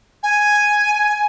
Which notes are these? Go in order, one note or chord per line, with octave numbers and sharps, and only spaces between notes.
G#5